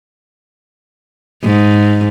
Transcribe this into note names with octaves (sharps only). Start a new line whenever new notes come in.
G#2